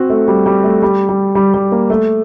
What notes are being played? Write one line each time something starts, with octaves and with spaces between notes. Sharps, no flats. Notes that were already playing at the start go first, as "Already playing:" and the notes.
Already playing: C4 F#4
A3
G3
G3
A3
G3
G3
G3
G3
A#3
A3